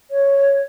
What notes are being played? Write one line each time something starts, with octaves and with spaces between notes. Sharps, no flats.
C#5